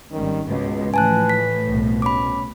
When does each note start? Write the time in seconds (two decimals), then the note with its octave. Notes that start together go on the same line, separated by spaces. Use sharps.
0.12 G#1 D#3 G3 C#4
0.48 C#2 G#2 B2
0.94 A2 E3 F3 B4 G#5 A5 F#6
1.29 B6
1.67 C2 B2
2.02 C#4 B5 D6